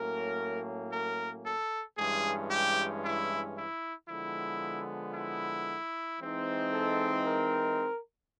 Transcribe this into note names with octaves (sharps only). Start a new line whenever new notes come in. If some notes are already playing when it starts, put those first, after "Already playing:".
Already playing: A2 F#3 A#3 C#4 A#4
A#4
A4
G2 E3 G#3 C#4 G#4
G4
E4
E4
D3 F3 G#3 B3 E4
E4
E3 G#3 C4 D#4
A4
A#4